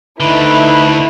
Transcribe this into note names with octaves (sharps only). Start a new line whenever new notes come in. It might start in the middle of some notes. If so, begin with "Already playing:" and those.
D2 D3 D#4 E4 B4